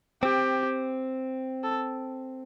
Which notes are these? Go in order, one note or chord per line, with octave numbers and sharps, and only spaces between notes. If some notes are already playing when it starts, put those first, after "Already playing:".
C4 G4
A4